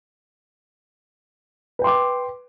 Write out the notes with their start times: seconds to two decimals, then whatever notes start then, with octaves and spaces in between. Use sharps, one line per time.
1.79 B4
1.82 G5
1.84 C6
1.87 D6